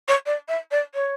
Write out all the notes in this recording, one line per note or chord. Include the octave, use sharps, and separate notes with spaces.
C#5
D5
E5
D5
C#5